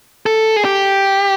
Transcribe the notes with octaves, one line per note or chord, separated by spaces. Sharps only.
A4
G#4
G4